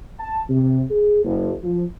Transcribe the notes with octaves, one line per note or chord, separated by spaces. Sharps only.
A5
C3
G#4
F#1
F3